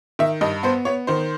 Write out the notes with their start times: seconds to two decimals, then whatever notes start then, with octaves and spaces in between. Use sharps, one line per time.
0.19 D#3 E5
0.41 G2 D#5
0.63 B3 C5
0.85 B3 C#5
1.07 D#3 C5